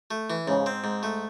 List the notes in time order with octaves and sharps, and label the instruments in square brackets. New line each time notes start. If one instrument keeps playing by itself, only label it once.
[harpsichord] A3
E3
[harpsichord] G#2 [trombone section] C#3
[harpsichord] C4
G#2
A3